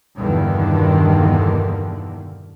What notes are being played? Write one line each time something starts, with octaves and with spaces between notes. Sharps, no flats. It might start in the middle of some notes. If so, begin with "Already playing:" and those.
E2 G2 B2 D3 D#3 A#3